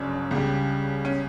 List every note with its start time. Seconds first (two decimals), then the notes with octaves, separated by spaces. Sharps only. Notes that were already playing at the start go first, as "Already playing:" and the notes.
Already playing: G1 F#2 C#3 D4
0.31 C#2 C#3 G3
1.05 C#4